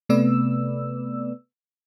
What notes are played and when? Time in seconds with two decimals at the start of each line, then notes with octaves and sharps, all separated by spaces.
0.09 C3 A3 B3 B4 D5 E6